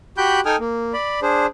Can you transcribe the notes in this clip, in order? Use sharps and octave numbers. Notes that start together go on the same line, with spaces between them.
F#4 G4 G5 B5 F#6 G6
D#4 A4 G5 G#5 D#6 F6
A#3
D5 B5
D4 G#4 C5